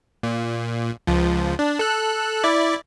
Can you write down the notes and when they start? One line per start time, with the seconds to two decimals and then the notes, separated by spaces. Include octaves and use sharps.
0.23 A#2
1.07 C#2 F3
1.59 D4
1.79 A4 F#6
2.44 E4 D5